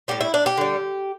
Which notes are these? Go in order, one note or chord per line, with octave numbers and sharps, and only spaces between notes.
A2 G3 G4
E4
D4
G4
D3 G3